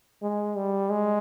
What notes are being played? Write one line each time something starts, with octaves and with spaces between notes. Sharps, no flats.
G#3
G3
G#3